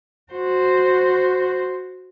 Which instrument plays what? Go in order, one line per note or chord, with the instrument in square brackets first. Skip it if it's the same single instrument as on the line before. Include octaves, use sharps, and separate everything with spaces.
[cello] F#4 C5